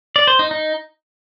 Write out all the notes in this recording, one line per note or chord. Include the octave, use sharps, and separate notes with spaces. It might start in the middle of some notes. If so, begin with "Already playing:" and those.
D5
C5
D#4
D#4